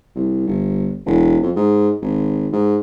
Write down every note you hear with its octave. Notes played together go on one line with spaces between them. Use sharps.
C2
G1
E1
F2
G#2
G#1
G#2